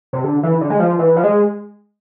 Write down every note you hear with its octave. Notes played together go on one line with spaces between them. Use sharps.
C3
D3
E3
D3
G#3
F3
E3
F3
G#3